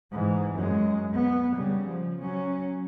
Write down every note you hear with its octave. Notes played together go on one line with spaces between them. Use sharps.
G#2 E3
F#2 G#3
B3
C#3 G3
F3
F#3 C#4